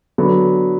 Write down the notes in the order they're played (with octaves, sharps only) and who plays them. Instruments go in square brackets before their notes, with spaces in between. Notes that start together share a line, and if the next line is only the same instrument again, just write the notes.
[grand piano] D3 F#3 B3